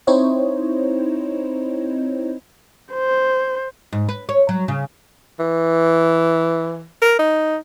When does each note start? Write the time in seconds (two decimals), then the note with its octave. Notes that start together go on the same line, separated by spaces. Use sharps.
0.07 C4 D#4 E4 C5 C#5 D#5
2.93 C5
3.92 G#2
4.09 B4
4.29 C#5
4.49 F#3
4.68 C#3
5.39 E3
7.02 A#4
7.19 D#4